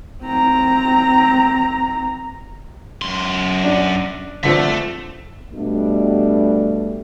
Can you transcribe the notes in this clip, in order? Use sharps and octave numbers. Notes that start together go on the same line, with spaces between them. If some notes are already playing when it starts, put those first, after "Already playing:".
C4 A#5
F#2 C6
D4
D3 F3 C4 A4 E5
B2 G3 A3 D4